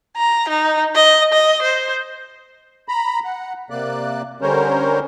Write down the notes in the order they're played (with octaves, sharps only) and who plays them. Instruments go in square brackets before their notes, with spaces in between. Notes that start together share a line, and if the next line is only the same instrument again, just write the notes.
[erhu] A#5
D#4
D#5
D#5
C5
[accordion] A#5 B5
F#5
C3 A#3 D5 F#6
D3 G3 C#4 A#4 C5 C#5